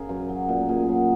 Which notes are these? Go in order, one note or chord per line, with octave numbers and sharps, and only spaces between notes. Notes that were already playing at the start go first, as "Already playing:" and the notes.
Already playing: C#3 G#4 A#4
F#2
F#3
A#2
A#2 G#4
F#3